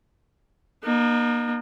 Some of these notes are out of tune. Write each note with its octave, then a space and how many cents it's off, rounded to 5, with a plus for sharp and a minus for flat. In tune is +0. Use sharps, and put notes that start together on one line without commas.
A#3 +35 D#4 -35